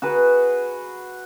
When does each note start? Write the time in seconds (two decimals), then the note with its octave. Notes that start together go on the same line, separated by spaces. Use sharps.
0.02 F#4 G#4 B4